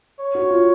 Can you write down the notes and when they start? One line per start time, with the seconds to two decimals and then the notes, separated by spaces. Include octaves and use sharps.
0.20 C#5
0.35 F#4
0.50 F4